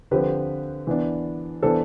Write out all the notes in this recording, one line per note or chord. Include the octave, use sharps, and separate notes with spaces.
D3 F3 C4 G4 B4
E3 B3 D4
E3 B3 D4 A4 C5